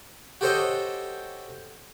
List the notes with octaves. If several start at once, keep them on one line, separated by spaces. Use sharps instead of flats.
F#4 G4 A4 C5 C#5 D#5